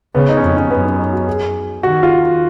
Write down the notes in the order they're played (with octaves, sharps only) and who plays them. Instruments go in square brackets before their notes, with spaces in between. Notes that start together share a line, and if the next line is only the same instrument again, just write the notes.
[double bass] C#3 [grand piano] B3
[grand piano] D#4
C#4
[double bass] F2 [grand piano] D#4
[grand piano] C#4
[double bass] F#2 [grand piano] B3
[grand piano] C#4
D#4
F#4
G#4
[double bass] D#3 [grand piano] F#4
[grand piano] F4